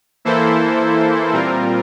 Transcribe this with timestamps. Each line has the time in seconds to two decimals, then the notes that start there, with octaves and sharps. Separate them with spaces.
0.25 E3 A#3 E4 A4 C5
1.32 A#2 G3 C4 F4 A#4